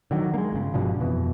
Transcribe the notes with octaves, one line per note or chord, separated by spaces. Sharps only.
D3 D#3 F#3
G#3 A#3
G1 C#3
G2 B2 D3 F3
F2 B2 E3